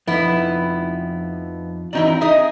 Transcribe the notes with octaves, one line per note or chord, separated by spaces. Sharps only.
F2 F3 B3 D#4 E4
E3 F#3 C4 D#4 E4 D5
D#4 G#4 D#5 E5